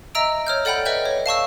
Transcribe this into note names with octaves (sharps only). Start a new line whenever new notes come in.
D#5 E5 A#5 E6 D7
C#5 F6 G6
A4 D5 F#5 G5 B5 G6
B4 D#5 E5 G5 G6
C#5
F5 A5 C#6 E6